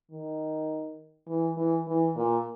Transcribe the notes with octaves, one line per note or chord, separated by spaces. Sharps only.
D#3
E3
E3
E3
A#2